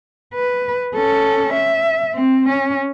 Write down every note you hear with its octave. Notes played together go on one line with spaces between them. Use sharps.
B4
C#4 A4
E5
C4
C#4